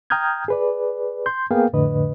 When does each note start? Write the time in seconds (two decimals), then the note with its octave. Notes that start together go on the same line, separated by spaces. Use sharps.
0.10 G5 A#5 D#6 F6 G6 G#6
0.48 G#4 B4 D5
1.26 C6 G6
1.51 A#3 B3 G#4 A#4 F5 G5
1.73 F2 A2 D3 B4 D#5